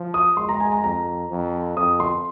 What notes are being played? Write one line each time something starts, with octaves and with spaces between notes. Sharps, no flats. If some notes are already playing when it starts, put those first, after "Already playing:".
Already playing: F3
D#6
G#3 C6
A#5
G#5
A#5
F2 A#5
F2
F2 D#6
C6